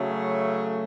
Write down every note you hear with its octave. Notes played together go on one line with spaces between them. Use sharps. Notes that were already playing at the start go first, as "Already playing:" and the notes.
Already playing: C#3 F#3 A3